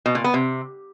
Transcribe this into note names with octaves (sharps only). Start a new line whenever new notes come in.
B2
A#2
B3
C3